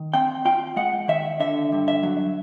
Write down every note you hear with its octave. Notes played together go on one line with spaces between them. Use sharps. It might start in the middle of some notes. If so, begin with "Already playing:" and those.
Already playing: D#3
C4 G5
F4 G5
G#3 F#5
D#3 E5
D3 E5
G2
E5
F#3